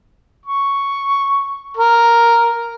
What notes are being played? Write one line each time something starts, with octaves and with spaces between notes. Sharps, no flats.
C#6
A#4